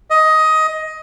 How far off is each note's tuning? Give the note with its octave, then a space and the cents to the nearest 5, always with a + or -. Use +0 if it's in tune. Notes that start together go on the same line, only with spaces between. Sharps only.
D#5 +15